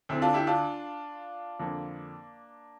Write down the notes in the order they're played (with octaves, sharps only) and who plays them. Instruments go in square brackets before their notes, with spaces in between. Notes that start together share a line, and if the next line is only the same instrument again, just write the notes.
[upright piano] D2 D3 C4 E4
D4 F4
E4 G4
D4 F4
F2 D3 A#3 D4